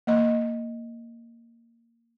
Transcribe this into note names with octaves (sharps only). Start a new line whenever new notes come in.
A#3 D#5